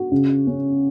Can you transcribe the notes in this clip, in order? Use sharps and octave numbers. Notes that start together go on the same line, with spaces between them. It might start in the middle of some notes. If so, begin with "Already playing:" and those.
Already playing: F#4
C#3
C#4